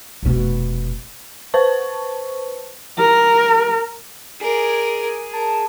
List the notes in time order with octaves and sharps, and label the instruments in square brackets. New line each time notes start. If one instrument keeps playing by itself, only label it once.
[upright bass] F1 B2
[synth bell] B4 C5 A5 C#6
[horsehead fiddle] A#4
[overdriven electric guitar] G#4 [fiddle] A#4 D5
[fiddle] A#4 [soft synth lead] A5